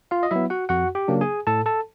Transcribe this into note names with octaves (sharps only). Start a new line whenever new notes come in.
F4 F5
D#5
F#3 B3 E4 E5
F#4 F#5
F2 F#4 F#5
G4 G5
C#3 F#3 A#3 D4
G#4 G#5
A2 A4 A5
A4 A5